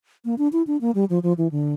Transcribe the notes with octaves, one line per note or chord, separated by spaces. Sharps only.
A#3
D4
E4
D4
A#3
G3
F3
F3
E3
D3